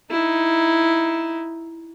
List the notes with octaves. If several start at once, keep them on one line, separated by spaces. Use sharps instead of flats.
D#4 E4